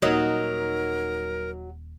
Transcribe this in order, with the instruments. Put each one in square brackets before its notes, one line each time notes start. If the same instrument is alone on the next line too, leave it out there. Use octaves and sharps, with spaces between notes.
[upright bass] D#1 [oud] F#3 D#4 [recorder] A#4